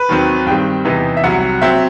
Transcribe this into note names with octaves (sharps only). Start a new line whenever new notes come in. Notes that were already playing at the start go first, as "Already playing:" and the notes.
Already playing: B4
D#2 D#3 F#3 C4
G2 D#3 G3 C4 G5
E2 C3 E3 B3 D#4
E5
C2 C3 F#3 F#5
F#3 C4 E5